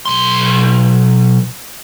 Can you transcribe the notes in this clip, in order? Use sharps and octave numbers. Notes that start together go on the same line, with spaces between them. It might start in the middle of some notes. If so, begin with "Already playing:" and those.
B1 C6